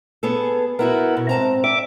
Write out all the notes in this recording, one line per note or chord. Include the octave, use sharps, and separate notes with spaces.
B3 G#4 A4
B3 E4 F#4 A#4
B2
G#2 C4 A5 A#5
D5 E5 D6